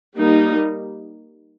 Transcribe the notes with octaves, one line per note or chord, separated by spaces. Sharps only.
G3 A#3 D#4